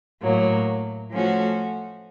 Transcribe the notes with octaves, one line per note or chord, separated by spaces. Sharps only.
A2 F#3 A#3
F3 A3 C#4 F#4